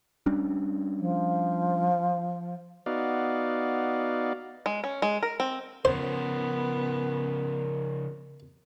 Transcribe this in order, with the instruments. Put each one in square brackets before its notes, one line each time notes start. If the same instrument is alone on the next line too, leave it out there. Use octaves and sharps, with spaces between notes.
[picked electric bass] G3 C#4 D4
[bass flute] F3
[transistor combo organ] B3 D#4 F#4 D5 F5
[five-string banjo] G#3
C#4
G#3
A#4
C4
[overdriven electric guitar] C#3 F3 [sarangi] B3 [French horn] A#4 [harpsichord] C5